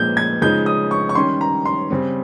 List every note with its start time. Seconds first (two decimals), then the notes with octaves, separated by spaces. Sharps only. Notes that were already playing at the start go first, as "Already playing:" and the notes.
Already playing: A#2 F3 G#3 G6
0.17 G#6
0.42 C#3 F3 G#3 D#4 G6
0.66 D#6
0.91 C#6
1.09 C#6
1.15 D#3 G3 C#4 C6
1.41 A#5
1.65 C6
1.90 C#3 G3 C4